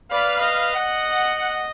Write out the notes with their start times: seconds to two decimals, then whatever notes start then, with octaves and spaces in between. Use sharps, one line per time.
0.11 B4 D5 F5 B5
0.41 D#5
0.75 F#5